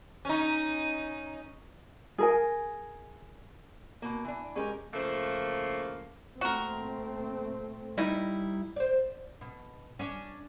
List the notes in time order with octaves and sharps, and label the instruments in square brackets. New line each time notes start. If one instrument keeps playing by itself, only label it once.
[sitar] C#4 D#4
[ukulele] G#4 A#4 G#5
[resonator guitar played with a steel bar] B2 A#3
E3 D4
[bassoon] G#3 [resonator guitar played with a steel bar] C#4 G4 A#4
[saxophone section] C#3 F3 A3 A#3
[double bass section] A#2 A3 C4 [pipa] F#4 A#4
[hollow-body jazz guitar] G3 D#4 E4
[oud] C5 D5
B2
C#4 D4